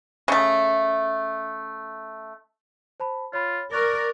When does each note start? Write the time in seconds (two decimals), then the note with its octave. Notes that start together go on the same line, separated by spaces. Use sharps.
0.28 C#3 A3
3.00 C5 A5 B5
3.33 F4 C#5 B5
3.73 A#4 D5 C#6 F#6 A6